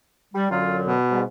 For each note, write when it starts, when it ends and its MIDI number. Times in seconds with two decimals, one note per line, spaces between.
0.34 0.50 55
0.51 0.95 42
0.51 0.95 50
0.51 0.95 54
0.51 0.78 65
0.85 1.22 47
1.11 1.23 44
1.11 1.23 55